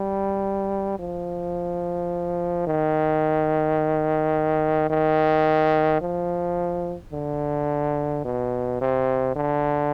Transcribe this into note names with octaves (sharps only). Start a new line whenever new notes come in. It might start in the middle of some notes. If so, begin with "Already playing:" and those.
Already playing: G3
F3
D#3
D#3
F3
D3
B2
C3
D3